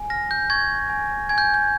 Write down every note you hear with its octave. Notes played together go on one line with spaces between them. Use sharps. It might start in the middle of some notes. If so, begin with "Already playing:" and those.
Already playing: G#5
F6 A#6
G6
C#6 G#6
G#5
G#5 G#6
G6
G6